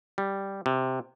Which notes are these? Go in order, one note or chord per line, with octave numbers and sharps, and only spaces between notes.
G3
C3